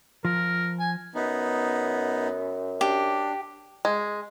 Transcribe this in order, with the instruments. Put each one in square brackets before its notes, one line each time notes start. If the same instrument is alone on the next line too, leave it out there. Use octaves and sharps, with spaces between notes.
[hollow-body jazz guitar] F3 [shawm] A#4
[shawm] G#5
[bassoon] F#2 [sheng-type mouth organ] B3 D#4
[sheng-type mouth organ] D4 [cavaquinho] G4
[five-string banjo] G#3